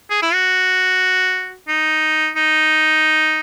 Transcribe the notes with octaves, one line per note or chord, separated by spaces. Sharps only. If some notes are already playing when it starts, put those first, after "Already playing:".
G#4
E4
F#4
D#4
D#4